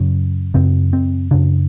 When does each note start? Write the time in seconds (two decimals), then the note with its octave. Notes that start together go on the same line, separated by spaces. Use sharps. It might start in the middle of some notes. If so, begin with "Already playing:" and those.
Already playing: F#2 C#3
0.54 F#2 C#3 C4
0.93 C4
1.31 F#2 C#3 D4